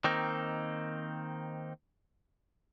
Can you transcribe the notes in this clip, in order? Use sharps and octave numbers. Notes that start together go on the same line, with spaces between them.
D#3 A#3 C4 D#4